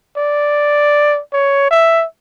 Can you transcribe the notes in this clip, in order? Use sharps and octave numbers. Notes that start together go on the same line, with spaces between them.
D5
C#5
E5